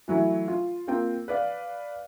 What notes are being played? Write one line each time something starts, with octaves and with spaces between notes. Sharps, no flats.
E3 F#3 A3 E4
F4
A#3 C4 F4 G5
B4 D5 F5